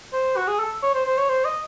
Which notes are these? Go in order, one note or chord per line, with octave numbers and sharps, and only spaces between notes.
C5
F#4
G#4
A4
C#5
C5
C5
C#5
C5
D#5